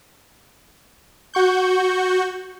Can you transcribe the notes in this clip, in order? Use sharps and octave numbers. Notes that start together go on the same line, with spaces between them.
F#4 C#6 G6